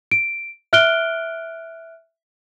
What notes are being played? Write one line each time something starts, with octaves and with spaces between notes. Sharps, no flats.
D7
E5 F6 F#6 D7 G7